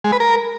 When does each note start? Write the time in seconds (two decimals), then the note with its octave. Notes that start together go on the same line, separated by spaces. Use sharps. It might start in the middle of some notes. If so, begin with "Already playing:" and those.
0.04 G#3
0.12 B4
0.20 A#4